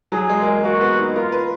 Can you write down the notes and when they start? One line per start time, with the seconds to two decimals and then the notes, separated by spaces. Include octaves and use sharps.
0.12 F#3 G#4
0.29 G#3
0.42 A#3
0.46 G#3
0.64 A#3 F#4
0.81 B3
0.99 D#4
1.15 F4 A#4
1.32 B4